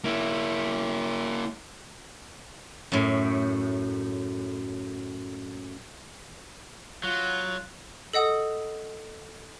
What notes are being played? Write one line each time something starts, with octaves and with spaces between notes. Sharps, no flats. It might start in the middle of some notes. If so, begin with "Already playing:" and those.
A#3 E4
F#2 A2
F#3 F4 F#6
A4 D#5 F#5 D#6